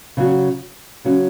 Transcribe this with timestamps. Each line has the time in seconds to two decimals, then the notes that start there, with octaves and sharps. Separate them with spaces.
0.17 C#3 F#3 C#4 F#4
1.04 C#3 F#3 C#4 F#4